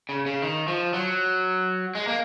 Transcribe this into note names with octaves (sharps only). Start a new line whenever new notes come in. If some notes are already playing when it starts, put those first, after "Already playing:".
C#3
C#3
D#3
F3
F#3
G#3
A#3